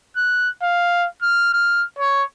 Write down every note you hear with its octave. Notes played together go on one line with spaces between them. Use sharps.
F#6
F5
F6
F6
C#5